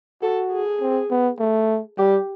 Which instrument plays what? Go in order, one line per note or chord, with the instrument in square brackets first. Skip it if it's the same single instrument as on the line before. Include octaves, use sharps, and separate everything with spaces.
[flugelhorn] F#4 [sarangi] A4
[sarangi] G#4
[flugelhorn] C4
B3
A3
[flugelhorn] G3 [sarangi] G4